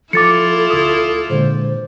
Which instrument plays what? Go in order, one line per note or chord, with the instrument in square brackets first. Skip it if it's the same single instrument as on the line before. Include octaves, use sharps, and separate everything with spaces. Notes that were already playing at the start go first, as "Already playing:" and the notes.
[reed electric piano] F3 [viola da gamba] E4 F4 [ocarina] A4 [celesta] D6 A6 C#7
[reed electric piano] D2 D#6
[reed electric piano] A#2 D3 G#3 [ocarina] C5